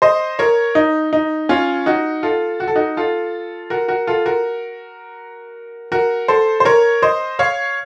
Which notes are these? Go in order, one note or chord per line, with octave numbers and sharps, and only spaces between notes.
C5 D#5
A#4 C#5
D#4
D#4
C#4 F4
D#4 F#4
F4 A4
F#4
A4
D#4 F#4
F4 A4
F#4 A#4
F#4 A#4
F4 A4
F#4 A#4
F#4 A#4
A4 C5
C5
A#4 C#5
C5 D#5
C#5 F5